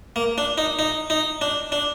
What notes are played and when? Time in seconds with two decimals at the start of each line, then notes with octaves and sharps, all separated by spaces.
0.16 A#3
0.38 D4
0.58 D#4
0.79 D#4
1.10 D#4
1.41 D4
1.72 D4